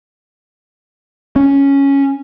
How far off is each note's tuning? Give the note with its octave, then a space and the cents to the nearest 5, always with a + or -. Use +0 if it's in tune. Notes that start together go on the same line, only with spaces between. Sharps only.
C#4 +0